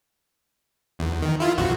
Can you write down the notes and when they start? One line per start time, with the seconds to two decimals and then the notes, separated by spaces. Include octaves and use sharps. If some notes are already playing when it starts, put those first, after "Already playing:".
0.99 E2
1.22 D#3
1.40 E4 F4
1.57 B1 F2 F#4